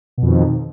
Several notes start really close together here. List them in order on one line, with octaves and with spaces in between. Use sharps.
B2 F2 D#3